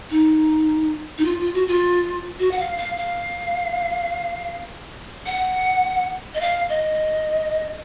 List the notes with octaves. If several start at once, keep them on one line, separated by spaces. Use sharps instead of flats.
D#4
D#4
F4
F4
F#4
F4
F#4
F#5
F5
F5
F5
F#5
D#5
F5
D#5